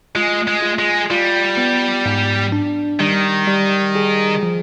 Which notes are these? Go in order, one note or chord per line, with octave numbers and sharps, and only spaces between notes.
G#3 F4
G#3
F4
G#3
G3 F4
B3
G#2
D4
D#3 G3
G3
G#4
F3